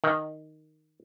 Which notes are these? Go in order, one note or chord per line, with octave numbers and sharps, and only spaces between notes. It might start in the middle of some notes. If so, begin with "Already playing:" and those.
D#3